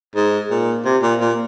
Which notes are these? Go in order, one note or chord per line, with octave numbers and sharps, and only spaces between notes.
G#2
A#2
C3
A#2
A#2